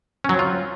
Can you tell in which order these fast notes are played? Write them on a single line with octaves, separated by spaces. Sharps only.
C#4 F#3 C4 F4